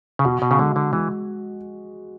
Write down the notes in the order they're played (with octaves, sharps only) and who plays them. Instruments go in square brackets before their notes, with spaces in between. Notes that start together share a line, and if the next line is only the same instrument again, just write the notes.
[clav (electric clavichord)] C#3
[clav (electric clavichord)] B2 [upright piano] F#4
[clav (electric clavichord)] B2
C#3
[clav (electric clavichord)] D3 [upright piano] G#3
[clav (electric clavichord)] D3
[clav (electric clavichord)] E3 [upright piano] G#3